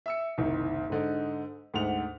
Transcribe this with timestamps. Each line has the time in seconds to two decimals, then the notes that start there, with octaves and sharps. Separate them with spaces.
0.06 E5 E6 C#7
0.38 F#1 C2 D#3
0.90 G#2 D3 D#4
1.74 D2 G#2 F#5 F7